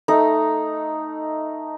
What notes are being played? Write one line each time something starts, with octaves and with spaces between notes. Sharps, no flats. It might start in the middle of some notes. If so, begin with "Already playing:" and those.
A3 D#4